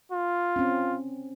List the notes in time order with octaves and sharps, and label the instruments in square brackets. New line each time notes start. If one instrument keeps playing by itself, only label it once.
[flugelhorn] F4
[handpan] C4 C#4